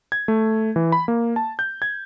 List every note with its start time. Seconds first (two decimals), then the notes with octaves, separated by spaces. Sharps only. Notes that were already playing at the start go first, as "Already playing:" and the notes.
0.12 G#6
0.28 A3
0.76 E3
0.92 B5
1.08 A#3
1.36 A5
1.59 G6
1.82 G#6